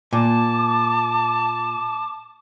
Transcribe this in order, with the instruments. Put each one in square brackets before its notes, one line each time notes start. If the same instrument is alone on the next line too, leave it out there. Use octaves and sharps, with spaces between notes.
[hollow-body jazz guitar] A#2 [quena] A5 [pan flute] D6